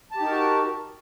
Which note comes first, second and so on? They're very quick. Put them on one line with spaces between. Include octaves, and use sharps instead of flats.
A5 G4 D#4 A#4 F#4